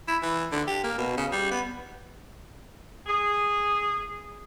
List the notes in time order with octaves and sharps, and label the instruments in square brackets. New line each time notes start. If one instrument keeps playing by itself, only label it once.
[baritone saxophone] E4
E3
D3
G4
A#3
B2
C#3
G3
B3
[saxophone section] G#4